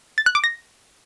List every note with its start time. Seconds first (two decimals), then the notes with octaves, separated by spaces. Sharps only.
0.18 A6
0.26 F#6
0.35 D6
0.44 A#6